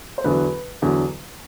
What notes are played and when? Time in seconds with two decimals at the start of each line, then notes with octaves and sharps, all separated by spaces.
0.18 C5
0.24 E2 D3 F#3 B4
0.82 E2 D3 F#3